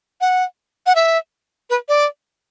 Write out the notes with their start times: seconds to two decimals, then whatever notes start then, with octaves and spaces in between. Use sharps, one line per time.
0.21 F#5
0.86 F#5
0.95 E5
1.70 B4
1.88 D5